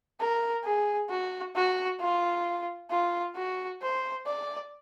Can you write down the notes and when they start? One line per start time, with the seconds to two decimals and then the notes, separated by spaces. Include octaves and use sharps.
0.20 A#4
0.64 G#4
1.10 F#4
1.55 F#4
2.01 F4
2.90 F4
3.36 F#4
3.82 C5
4.26 D5